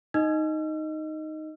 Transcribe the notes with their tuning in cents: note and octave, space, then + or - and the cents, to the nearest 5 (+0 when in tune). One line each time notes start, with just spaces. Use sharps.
D#4 +0 D#5 +0 E6 +45